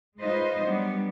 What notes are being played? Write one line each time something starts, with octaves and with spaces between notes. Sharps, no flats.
G#3 D#4 F4 B4 C5 D#5
F#3 G3 B3 D4